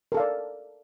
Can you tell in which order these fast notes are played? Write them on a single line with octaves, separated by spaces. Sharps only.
A#4 A4 F5 D5